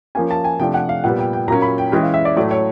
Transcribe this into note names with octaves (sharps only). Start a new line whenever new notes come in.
F3 A#3 C#4 G#5
A5
G#5
C3 F3 A3 D4 G5
F#5
F5
A#2 G3 B3 F#5
G5
G5
A#2 F#3 A#3 C#4 A#5
B5
G5
E3 G#3 C#4 G5
F5
E5
D5
A2 F#3 A3 D5
C#5